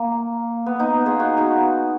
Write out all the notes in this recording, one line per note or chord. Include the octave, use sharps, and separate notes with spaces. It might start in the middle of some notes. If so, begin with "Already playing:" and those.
Already playing: A#3
B3
B3 D#4
F4 G#4
D#4 F#4
D#4 F#4